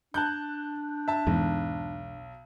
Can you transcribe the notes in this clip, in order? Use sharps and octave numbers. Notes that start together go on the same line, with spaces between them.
D4 A5 F#6 G6
E5 A5
B1 E2 G#2